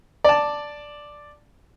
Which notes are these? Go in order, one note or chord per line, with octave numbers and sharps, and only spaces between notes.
D5 A5